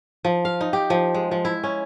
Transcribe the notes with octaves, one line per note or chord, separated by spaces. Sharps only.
F3
F5
D#4
G4
F3
G#3
F3
E4
C#4